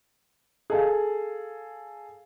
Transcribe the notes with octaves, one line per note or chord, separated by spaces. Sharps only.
G#4 A4 F5